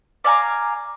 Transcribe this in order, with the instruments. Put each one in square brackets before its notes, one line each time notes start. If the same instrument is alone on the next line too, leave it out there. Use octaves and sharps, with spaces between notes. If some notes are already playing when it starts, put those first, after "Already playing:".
[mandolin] D5 F5 G#5 A#5